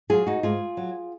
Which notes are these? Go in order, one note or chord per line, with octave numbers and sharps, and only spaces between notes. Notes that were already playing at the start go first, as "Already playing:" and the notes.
F#3 F4 G#4
D#4 F#4
G#2 F4 G#4
F#3